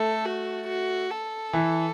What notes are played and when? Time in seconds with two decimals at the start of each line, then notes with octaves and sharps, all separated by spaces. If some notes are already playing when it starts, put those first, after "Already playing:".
Already playing: A3 A4
0.25 F#4
0.68 F#4
1.10 A4
1.53 E3